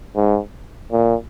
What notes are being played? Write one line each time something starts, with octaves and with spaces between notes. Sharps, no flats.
G#2
A#2